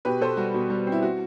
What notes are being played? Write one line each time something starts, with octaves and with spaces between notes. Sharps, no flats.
B2 G4 B4
B2 A4 C5
G3 F#4
B2
G3
C4
E4
F#4